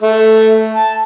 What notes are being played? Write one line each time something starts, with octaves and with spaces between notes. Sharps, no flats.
A3
A5